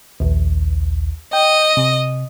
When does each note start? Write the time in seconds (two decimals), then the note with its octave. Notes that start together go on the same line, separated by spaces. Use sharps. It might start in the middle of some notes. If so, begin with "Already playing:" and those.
0.20 A#1 D#2
1.33 D#5 G5
1.77 C3